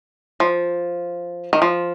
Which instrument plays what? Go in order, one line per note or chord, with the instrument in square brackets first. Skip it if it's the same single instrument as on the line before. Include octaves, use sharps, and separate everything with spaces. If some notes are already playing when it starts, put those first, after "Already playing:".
[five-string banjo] F3
D#3
F3